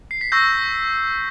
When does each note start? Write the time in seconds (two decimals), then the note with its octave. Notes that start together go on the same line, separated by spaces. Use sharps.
0.11 C7
0.21 B6
0.32 C#6 E6 G6 A#6